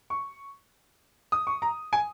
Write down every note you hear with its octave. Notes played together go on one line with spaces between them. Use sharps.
C#6
D#6
C#6
A#5
G#5